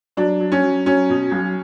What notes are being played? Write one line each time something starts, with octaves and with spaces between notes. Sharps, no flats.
F#3 D4
F#3
C#4
F#3
F#3 C#4
B2
B1